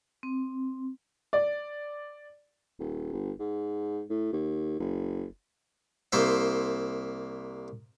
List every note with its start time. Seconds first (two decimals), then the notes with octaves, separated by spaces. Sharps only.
0.23 C4
1.33 D5
2.79 D#1
3.13 G1
3.39 G#2
4.10 A2
4.33 D#2
4.80 F#1
6.12 C2 A#3 C5 E5